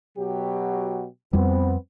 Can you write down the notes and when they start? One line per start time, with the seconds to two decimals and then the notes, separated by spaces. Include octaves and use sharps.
0.18 B2 F#3 G4
1.33 F2 G3 B3 C4